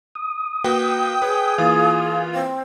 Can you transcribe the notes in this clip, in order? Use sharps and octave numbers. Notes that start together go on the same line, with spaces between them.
D#6
A#3 F#4 B4 G5
G#4 B4 C#5
E3 A#3 F4
C4